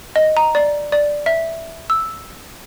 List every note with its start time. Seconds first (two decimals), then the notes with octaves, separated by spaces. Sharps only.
0.16 D#5
0.37 A#5
0.55 D5
0.92 D5
1.26 E5
1.90 E6